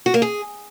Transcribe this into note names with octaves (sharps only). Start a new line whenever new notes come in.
F#4
A#3
G#4